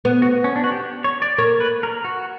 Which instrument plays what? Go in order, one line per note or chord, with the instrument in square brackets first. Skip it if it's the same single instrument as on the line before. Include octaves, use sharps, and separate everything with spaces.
[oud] B3
[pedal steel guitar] F#4
C#4
D4
F#4
G4
C#5
D5
[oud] A#3 [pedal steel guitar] C#5
[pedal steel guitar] B4
A#4
F#4